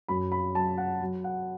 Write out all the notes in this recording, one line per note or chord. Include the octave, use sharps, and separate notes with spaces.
F#2 B5
B5
F#3 A5
F#5
F#3
F#5